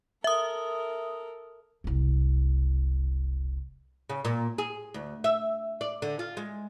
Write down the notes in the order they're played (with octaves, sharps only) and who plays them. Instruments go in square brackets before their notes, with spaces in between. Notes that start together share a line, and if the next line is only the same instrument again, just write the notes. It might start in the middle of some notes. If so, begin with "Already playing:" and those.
[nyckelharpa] A4 A#4 [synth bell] E5 D#6
[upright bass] E1 C2
[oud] C#3
A#2
G#4
D2
E5
D5
D3
F4
G#3